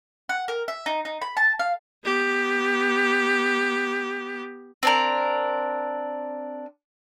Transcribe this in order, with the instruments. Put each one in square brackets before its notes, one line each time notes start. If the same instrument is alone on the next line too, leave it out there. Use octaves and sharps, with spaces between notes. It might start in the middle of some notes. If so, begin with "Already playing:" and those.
[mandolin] F#5
A#4
E5
D#4
D#4
B5
A5
F5
[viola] B3 G4
[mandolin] C4 D4 A#4